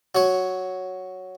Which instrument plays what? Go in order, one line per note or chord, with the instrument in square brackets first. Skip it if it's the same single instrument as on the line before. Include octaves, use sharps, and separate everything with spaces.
[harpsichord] F#3 C#5